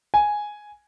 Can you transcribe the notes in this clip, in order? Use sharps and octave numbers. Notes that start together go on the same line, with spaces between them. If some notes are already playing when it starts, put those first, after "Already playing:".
G#5